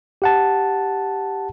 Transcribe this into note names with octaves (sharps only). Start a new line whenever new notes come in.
G4 F#5 A5